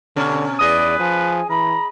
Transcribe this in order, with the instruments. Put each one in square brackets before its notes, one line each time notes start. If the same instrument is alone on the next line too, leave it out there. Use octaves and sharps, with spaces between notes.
[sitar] B2 C#4 [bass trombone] D3
[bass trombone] E2 [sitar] G#4 D#5 [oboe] B4 [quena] D5
[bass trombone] F3 [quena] G#5
[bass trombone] E3 [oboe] A#5 [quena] B5